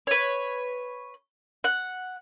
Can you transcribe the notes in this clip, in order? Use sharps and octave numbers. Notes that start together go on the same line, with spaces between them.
B4 C#5
F#5